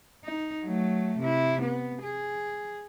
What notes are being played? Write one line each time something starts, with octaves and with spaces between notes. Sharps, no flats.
D#4
F#3 A3
C3 E4
B3
G#4